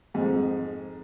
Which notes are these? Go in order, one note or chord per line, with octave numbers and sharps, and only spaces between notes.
F2 G#2